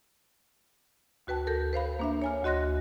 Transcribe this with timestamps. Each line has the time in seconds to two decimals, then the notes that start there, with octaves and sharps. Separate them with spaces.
1.27 D2 F#4 B4 G5 A5
1.47 A4 A#4 G6
1.73 B4 C5 F5 B5
1.99 A#3 D4 E5
2.22 C#5 G#5 F6
2.43 D2 F#4 D#5 C6 F#6 A#6